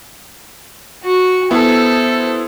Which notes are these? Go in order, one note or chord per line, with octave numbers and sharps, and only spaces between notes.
F#4
B3 E4 A4 C5